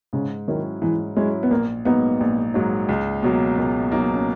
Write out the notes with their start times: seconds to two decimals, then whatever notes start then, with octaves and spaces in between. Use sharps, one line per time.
0.13 G#2 C#3
0.48 D#3 F#3 C#4 E4
0.82 G#2 E3
1.16 F#3 G#3 C#4 E4
1.43 B3
1.51 A#1 A#3
1.85 G#2 F#3 A#3 B3 D#4
2.20 A#1
2.54 G#2 F#3 A#3 D#4
2.89 C#2
3.23 B2 F#3 A#3
3.58 C#2 A#3
3.92 B2 F#3 A#3 D#4
4.16 C#4